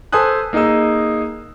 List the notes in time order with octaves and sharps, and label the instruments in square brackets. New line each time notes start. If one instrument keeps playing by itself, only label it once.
[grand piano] A4 B4 C5 G#5 D#6 F#6
A#3 D#4 G#4 D#5 E6